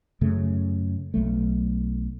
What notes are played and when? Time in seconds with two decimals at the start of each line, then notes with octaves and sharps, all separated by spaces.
0.21 F#2 C#3 A3
1.14 B1 F#3 A3